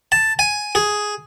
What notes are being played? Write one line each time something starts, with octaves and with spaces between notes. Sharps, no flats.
A5
G#5
G#4